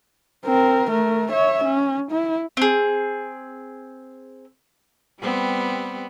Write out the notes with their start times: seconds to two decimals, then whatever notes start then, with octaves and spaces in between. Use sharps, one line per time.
0.46 C4 A#4
0.90 A3 A#4
1.32 C#5 E5
1.65 C#4
2.11 E4
2.57 C4 G#4
5.20 G3 B3 C4